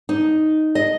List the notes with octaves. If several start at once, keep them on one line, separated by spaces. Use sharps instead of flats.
D#4
D#5